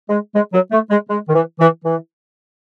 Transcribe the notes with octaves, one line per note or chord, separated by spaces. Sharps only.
G#3
G#3
F#3
A3
G#3
G#3
D#3
E3
E3
E3